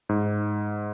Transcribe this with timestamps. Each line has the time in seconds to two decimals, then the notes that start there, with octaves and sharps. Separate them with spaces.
0.09 G#2